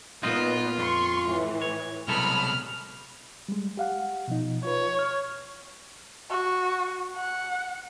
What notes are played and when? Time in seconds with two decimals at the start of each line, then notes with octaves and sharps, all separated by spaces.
0.23 A#2 B3 D#4 F4 F#4 D#5
0.78 F2 C6 C#6
1.27 A2 E3
1.62 C#5
2.08 C2 B2 F#3 G#3 A4 B5 F6
3.49 G3 G#3
3.77 G4 F5 F#5
4.28 B2 F3 D#4
4.65 F4 B4 C#5
4.99 F6
6.30 F#4
7.16 F#5